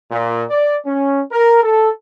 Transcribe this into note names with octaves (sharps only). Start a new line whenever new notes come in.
A#2
D5
C#4
A#4
A4